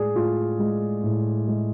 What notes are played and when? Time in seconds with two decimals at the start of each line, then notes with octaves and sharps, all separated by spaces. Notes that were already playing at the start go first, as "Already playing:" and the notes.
Already playing: A2 G#3 G#4 D5
0.15 A2 F4
0.59 G#3
1.04 A2
1.48 G#3